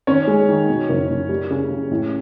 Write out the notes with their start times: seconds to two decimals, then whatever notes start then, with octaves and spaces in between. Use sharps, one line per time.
0.07 D#3 C#4 C#5
0.27 G#3
0.49 D#3
0.69 B2
0.89 F#1
1.10 F#1
1.29 G3
1.50 C#3
1.70 C#3
1.91 A1